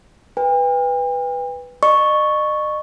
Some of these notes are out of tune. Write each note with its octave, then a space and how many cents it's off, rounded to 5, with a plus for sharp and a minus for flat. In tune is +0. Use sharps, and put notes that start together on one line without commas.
B4 +0 G5 +45
D#5 -40 C#6 +0